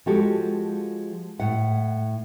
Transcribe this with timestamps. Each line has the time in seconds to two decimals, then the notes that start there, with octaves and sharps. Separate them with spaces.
0.06 F3 G#3 F#4 G4 A4
1.40 A2 F#5